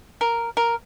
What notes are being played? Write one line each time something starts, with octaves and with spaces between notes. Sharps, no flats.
A#4
A#4